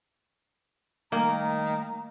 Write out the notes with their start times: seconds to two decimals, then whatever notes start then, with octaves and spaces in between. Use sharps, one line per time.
1.12 D#3 G3 A3 A#3 G5 A#5